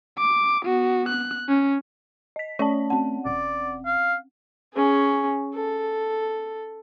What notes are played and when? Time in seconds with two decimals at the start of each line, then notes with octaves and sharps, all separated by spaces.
0.19 D6
0.66 B3 F#4
1.09 F#6
1.49 C#4
2.36 D#5 B6
2.59 A3 C#4 C#5 D5 A5
2.90 C4 F#5 A5
3.25 E1 D5
3.86 F5
4.74 C#4 G#4
5.54 A4